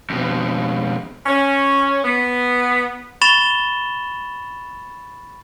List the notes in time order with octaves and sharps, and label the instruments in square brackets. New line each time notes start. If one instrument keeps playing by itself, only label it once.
[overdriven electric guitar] F2 B2
[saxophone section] C#4
B3
[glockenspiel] B5 C#6 A6 E7 F7 G7